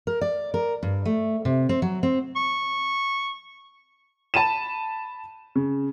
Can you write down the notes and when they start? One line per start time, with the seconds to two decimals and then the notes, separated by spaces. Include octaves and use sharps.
0.07 A#4
0.21 D5
0.54 A#4
0.83 G2
1.05 A3
1.45 C3
1.69 C4
1.82 F#3
2.03 C4
2.36 C#6
4.34 A5 B5 D#7 E7
5.55 C#3